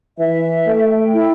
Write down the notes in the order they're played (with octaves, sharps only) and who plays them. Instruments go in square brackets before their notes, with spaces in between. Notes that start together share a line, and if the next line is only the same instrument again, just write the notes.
[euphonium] E3 [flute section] E5
[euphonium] A3 [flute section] G5
[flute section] E4